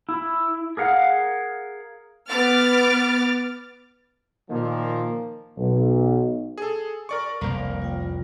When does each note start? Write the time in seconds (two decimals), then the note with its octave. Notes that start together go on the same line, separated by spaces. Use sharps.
0.09 E4
0.77 G#4 A#4 F5 F#5
2.29 B3 B4 D6 F6 A6
4.50 A#2 D#3 F3 A#3
5.56 B1
6.58 G#4 A4 G#5
7.09 A#4 D5 C#6
7.41 F1 C2 A#3 A#4 D5 F5
7.82 F4 G5